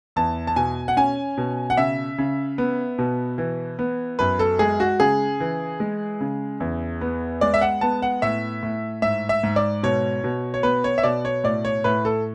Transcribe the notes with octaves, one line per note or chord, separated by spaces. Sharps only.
E2 A5
A5
B2 G#5
F#5
C#4 G#5
B2
F#5
C#3 E5
C#3
B3
B2
E3
B3
F#2 B4
A4
G#3 G#4
F#4
C#3 G#4
E3
G#3
C#3
E2
B3
G#3 D5
E5
F#5
B3 A5
F#5
A2 E5
A2
G#2 E5
E5
G#2
D5
B2 C#5
B2
C#5
B3 B4
C#5
E5
B2 D5
C#5
A2 D5
C#5
A2 B4
A4